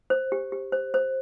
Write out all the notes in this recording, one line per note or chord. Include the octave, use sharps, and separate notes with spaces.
C5
G4
G4
C5
C5